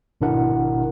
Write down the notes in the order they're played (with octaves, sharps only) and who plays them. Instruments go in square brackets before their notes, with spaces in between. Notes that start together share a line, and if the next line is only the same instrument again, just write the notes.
[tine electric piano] G#1 B2 D4 E4 A#4 F#5